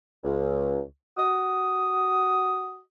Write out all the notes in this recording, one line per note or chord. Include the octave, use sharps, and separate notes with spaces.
C#2
F#4 D#6